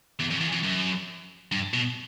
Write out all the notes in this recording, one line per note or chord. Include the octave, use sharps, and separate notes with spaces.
E2
F2
E2
F2
F#2
G2
B2